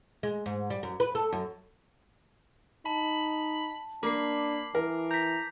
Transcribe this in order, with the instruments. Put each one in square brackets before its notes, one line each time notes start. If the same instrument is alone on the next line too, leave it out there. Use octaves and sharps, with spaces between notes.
[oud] G#3
G#2
G3
F#2
B4
A4
F#2
[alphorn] D#4 [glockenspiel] A5 [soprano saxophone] B5
[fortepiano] A#3 [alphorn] D4 [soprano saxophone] B5 [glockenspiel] D6 C7
[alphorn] E3 [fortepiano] A#4
[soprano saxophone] A#5 [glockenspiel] G6 B6